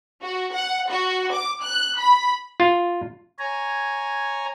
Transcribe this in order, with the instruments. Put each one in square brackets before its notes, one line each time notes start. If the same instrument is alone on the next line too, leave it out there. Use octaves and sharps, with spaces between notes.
[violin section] F#4
F#5
F#4
D6
F#6
B5
[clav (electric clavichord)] F4
[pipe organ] C#5 G#5 A#5